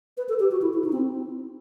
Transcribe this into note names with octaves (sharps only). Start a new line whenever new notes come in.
B4
A4
G4
F#4
E4
E4
D#4
C4